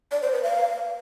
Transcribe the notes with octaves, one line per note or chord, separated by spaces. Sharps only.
D5
C5
B4
F5